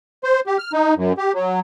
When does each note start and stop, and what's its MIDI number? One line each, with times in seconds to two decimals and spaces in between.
0.24 0.40 72
0.47 0.57 67
0.58 0.72 89
0.73 0.94 63
0.96 1.13 42
1.18 1.32 67
1.34 1.60 54